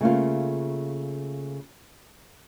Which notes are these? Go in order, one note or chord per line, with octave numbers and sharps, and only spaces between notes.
C#3 A3 A#3 F4